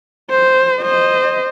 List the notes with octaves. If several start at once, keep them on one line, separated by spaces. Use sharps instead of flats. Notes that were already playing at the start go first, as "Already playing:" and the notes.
C5
C5 D#5